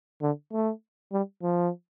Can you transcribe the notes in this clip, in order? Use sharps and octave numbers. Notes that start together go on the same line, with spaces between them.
D3
A3
G3
F3